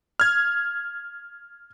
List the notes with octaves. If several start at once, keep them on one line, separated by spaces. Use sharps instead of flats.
F6 G#6